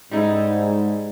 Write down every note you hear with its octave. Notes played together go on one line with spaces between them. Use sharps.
G#2 G3 D#4 E4